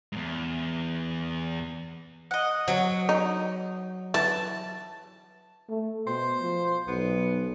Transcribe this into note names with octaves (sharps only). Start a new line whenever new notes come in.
E2 G#2
D#5 F#5
F#3
D#4
E3 A5
A3
B2 C5
F3
B1 B3